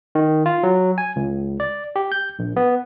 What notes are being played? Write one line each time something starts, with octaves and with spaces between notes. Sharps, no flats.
D#3
F4
F#3
G#5
C#2
D5
G4
G6
A#1
B3